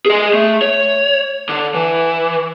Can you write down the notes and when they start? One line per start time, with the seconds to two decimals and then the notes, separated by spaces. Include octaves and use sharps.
0.06 G#4 D#5
0.34 A3
0.62 C#5
1.49 D3
1.74 E3